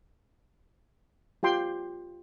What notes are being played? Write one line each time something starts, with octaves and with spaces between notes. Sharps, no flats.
F4 G4 G5 C6